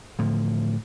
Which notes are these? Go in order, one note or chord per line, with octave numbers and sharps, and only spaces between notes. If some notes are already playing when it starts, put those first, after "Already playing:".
A2 D3 F3